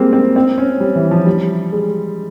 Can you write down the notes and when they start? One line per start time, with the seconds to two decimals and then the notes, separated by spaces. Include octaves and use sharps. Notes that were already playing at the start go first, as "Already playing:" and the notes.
Already playing: G3 G#3 A#3 C4
0.13 C4
0.36 C4
0.58 C#4
0.80 G3
0.96 E3
1.11 F3
1.26 G3
1.73 G#3